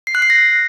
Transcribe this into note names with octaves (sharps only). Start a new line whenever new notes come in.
C7
F#6
C7
A#6